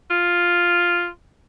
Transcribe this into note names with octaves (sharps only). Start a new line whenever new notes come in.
F4